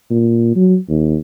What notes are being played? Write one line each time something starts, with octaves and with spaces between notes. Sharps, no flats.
A#2
F#3
D#2